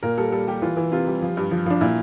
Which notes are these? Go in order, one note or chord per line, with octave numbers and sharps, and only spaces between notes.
A#2 A#4
G3 A4
G3 A4
G3 G4
E3 F4
E3
C3 F4
G3
F3
G2
F3
F3 D4
A#2 E4